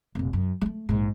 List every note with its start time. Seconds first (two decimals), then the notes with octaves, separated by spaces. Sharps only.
0.15 F1 A#2
0.33 F#2
0.61 G#3 A3
0.89 A#1 G#2